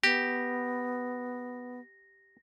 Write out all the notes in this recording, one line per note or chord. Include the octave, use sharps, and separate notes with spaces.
B3 G4 A#6